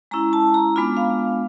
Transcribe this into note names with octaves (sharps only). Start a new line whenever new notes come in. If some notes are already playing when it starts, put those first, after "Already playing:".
G#3 C#4 E4 A#5
A5
A#5
G#3 B3 D4 F4 B5
F5